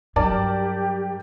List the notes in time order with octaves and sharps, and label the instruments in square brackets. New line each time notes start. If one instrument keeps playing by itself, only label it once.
[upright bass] G2 F#3 [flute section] G4 [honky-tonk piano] A#4 D5 A5